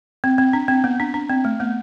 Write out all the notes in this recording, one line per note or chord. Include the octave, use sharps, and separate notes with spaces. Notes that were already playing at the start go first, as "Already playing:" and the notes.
C4
C4
D4
C4
B3
D4
D4
C4
A3
B3